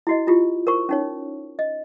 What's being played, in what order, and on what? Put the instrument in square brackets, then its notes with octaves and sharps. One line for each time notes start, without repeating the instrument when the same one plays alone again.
[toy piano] E4 F#4 D#5
E4 F4 G4
A#4 C5 C#6
C#4 D#4 C#5
D#5